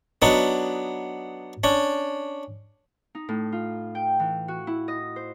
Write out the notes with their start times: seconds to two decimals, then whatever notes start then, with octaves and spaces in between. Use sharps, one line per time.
0.22 F#3 B3 D4 D#4
1.64 C#4 D4
3.15 D#4
3.29 A2
3.52 F4
3.95 G5
4.20 E3
4.48 F#4
4.67 E4
4.88 D#5
5.16 C5